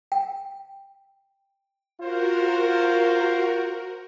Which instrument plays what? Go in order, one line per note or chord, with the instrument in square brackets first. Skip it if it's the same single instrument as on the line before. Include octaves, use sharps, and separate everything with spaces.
[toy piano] G5
[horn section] F4 C5 [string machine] F#4 A#4